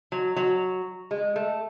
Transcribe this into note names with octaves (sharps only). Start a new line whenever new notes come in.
F#3
F#3
G#3
A3